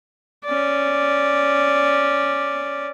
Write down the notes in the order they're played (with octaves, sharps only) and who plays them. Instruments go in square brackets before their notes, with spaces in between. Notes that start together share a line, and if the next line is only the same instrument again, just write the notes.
[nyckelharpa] C#4 D5